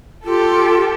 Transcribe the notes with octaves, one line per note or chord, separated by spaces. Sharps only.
F4 G4 A4